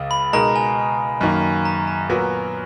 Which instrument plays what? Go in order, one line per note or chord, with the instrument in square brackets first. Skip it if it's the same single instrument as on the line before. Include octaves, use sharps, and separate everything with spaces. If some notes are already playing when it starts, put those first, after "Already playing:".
Already playing: [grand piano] C#2 C#3
[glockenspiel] B5
[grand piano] B2 G#3 D#4 A#4 [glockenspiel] A#5
[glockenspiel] G#5
[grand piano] F#2 D#3 A#3
[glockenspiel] A#5
A#5
[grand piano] A#2 F#3 B3 F#4 A#4